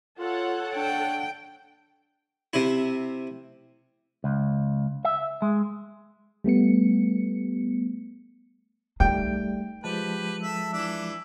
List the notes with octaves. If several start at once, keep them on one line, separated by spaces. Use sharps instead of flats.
F4 A4 C#5 F#5
D4 G5
C3 E4
C#2
E5
G#3
G3 A3 B3 C#7
G3 A3 D#4 G5
F3 G#3 G4 B4 A5
A4 E5
E3 D4 E5